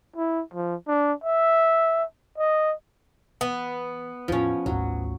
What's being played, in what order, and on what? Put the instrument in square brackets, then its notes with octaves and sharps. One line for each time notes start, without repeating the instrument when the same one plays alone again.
[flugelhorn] E4
F3
D4
E5
D#5
[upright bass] E3 [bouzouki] B3
[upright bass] E2 A2 [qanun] F3 C#4
[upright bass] D#1 G#1 [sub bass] D2 [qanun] F#3